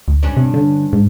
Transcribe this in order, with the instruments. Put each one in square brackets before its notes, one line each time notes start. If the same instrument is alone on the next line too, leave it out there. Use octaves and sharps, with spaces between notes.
[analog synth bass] D2
[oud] G2 C#4 D4
[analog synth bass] C3
D3
G#2